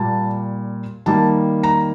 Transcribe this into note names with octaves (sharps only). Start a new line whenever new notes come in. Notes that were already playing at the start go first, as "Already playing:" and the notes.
Already playing: A#2 G3 A#3 A5
D#3 G3 A#3 A5
A#5